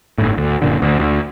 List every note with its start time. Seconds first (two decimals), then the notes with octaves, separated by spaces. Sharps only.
0.18 G1 A2
0.37 D2
0.62 F#1 A#2 D3
0.82 D2
0.99 D2